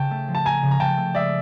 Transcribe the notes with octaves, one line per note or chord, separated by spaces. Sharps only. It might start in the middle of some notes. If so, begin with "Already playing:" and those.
Already playing: C#3 G5 A5
A3
F3
A5
F3 G#5 A#5
C#3
A#5
C#3 G5 A5
A3
G#3 D5 E5